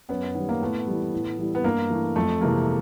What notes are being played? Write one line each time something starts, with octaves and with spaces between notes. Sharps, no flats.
F#2 B3 C#4
D#3 G3 B3
A#3
A2 A3 B3
E3 G3
A2
E3 G3
B3
G2 A#3
E3 A3
F2 A3
C3 E3 G#3 A#3